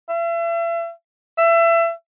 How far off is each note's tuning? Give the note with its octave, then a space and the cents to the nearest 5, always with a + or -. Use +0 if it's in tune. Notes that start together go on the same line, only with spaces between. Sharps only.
E5 +40
E5 +30